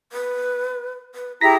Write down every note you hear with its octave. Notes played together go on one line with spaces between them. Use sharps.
B4
B4
E4 G4 G#4 A#5 A#6 B6